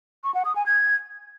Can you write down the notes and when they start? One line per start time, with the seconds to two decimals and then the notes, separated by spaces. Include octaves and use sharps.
0.24 C#6
0.34 F#5
0.45 D#6
0.55 G#5
0.66 G#6